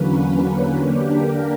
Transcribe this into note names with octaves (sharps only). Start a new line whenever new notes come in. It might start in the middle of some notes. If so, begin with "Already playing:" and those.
Already playing: E2 D3 F#3 A#3 C#4 B4
B4
D3 A#3 D4 G4
A#4